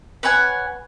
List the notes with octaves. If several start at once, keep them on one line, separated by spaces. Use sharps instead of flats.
B4 C#5 F#5 G#5